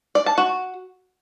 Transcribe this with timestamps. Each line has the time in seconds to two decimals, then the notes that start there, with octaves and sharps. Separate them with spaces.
0.15 D5
0.26 A5
0.38 F#4